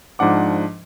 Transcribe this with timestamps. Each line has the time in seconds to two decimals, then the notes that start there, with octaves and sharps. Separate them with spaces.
0.19 G#2 F3 D4 F#5 D6